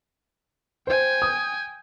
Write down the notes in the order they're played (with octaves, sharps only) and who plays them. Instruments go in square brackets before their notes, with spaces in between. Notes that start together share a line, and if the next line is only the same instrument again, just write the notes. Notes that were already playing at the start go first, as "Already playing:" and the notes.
[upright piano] C5 [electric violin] G5 G#5
[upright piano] D#6